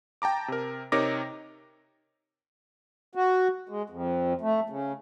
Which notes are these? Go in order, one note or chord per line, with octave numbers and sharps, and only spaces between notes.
G5 A5 A#5 D6
C3 A#4
C3 D#4 A#4 C#5 D6 A#6
F#4
G#3
F2
A3
C#3